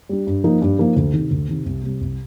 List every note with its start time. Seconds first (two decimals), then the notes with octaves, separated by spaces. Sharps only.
0.09 G3 D4
0.27 G2
0.44 F3 A#3 D#4
0.62 G2
0.79 F3 A#3 D#4
0.96 D2
1.13 C3 D#3
1.31 D2
1.48 C3 D#3
1.65 C2
1.83 C3 G3
2.01 C2